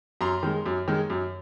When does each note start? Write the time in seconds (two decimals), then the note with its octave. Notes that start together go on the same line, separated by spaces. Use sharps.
0.21 F#2 A#5 C6
0.43 D#3 G#3
0.66 F#2
0.88 D#3 G#3
1.10 F#2